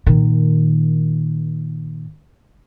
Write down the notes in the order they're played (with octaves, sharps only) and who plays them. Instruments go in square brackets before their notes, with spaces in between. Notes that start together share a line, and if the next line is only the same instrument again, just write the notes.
[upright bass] A#2 D#3